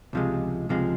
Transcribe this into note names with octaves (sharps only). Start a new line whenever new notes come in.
C#2 C3 F3 G#3
C#2 C3 F3 G#3